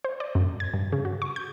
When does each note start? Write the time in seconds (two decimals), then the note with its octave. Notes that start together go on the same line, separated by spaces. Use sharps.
0.05 C5
0.20 D5
0.35 F#2
0.60 G#6
0.74 G2
0.92 C#3
1.05 F#4
1.22 C#6
1.36 G6